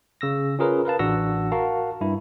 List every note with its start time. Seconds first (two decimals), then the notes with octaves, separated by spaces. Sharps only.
0.21 C#3 E6 A#6
0.59 C#4 F4 G#4 A#4 B4 C#5
0.85 A#4 B4 F5 A5
0.99 A1 D4 F#4 F#5 E6 A#6
1.52 F#4 A#4 F5 A5
2.01 G2 E4